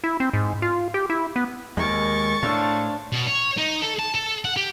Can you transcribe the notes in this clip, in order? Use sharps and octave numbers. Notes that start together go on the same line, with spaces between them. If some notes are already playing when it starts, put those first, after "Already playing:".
E4
C4
G#2
F4
G4
E4
B3
D#2 G#3 A#4 C#6 A6
A2 D4 C5 F5 A5
B2
C#5
D#4
A4
A5
A4
F#5
G4